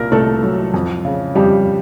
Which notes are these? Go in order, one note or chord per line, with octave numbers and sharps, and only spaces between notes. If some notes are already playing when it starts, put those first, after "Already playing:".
Already playing: C2 A#2 A#3 A#4
C2 A3 A4
F#3
F2
C#3
F2 G3 G4